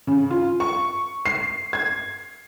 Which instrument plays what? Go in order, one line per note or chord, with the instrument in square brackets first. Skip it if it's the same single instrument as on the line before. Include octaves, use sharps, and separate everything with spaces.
[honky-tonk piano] C#3
F4
C#6
C7
G#6